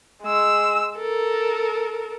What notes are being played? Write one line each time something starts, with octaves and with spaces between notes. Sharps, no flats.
G#3 E6
A4 A#4